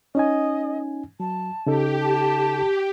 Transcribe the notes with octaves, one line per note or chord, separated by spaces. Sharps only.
C#4 D#4 D#5 G#5
F#3 A5
C#3 D#4 G4 A4
A5